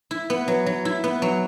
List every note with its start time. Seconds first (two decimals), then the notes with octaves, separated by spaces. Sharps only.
0.11 E4
0.30 B3
0.48 F#3
0.66 F#3
0.85 E4
1.04 B3
1.22 F#3